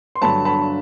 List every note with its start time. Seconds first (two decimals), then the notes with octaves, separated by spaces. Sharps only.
0.15 C6
0.22 G2 D3 F#3 A5 B5
0.45 A5 B5